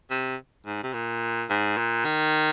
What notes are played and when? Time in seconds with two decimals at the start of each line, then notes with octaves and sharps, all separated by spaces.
0.11 C3
0.66 G#2
0.83 C3
0.93 A#2
1.50 G#2
1.77 A#2
2.05 D#3